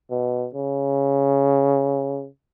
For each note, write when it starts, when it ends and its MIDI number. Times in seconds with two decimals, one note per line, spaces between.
0.11 0.47 47
0.55 2.27 49